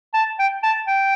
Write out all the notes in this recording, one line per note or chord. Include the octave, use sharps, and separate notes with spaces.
A5
G5
A5
G5